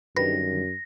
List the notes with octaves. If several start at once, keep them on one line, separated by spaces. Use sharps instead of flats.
F#2 D3 D#3 G3 B4 A#6